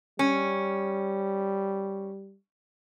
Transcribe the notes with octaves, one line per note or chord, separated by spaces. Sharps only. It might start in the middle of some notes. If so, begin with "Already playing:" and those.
G3 C#4